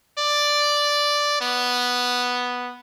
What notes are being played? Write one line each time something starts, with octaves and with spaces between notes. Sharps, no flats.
D5
B3